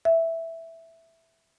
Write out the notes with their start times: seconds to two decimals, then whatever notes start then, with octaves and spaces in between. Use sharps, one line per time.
0.05 E5